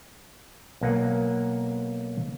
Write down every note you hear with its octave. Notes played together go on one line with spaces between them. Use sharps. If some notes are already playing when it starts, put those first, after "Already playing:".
B1 A#3 F#5 G#5